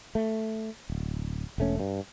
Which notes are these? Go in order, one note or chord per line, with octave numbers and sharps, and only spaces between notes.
A3
D1
E1 A3 C#4
G2